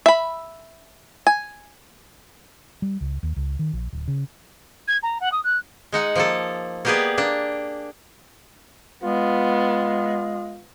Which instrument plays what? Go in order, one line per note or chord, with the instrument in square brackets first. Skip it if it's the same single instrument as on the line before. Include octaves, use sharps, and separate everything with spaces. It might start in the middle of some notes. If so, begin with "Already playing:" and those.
[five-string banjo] E5 B5
G#5
[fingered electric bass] G3
C#2
D#2
C#2
D#3
A#1
D1
C#3
[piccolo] G#6
A#5
F#5
D#6
F#6
[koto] G#3 D#4 F#5
F3 A#3 A4
A#3 B3 G4 G#4 B4 D5
A#3 D4
[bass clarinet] G#3 [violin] B3 [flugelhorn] F4